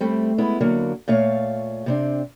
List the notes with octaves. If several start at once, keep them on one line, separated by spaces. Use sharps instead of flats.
G3 A3 C4
G#3 B3 E4
D3 F#3 A#3
A#2 A3 C#5 F5
C3 C4 D4